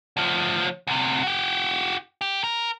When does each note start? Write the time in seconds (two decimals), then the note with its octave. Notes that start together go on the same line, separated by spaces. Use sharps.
0.17 D2 F3
0.87 D2 C3
1.23 F#4 G4
2.21 G4
2.44 A#4